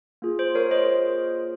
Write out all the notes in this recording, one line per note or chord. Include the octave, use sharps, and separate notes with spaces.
A#3 F4 G#4
C5
A#4 C#5
C5 D#5